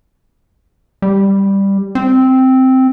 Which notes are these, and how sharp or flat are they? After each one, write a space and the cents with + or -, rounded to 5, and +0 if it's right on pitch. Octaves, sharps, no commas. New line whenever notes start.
G3 +5
C4 -5